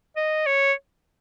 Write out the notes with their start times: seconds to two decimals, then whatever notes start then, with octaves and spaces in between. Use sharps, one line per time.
0.16 D#5
0.46 C#5